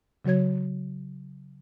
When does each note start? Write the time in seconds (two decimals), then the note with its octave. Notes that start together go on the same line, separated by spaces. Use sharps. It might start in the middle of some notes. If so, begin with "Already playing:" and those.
0.25 C#3 F#3 F#4 C#5 G#6